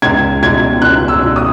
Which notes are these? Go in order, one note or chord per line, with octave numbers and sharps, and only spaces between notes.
C#2 G#6
B2 G#6
C#2 F#6
E6
B2
D#6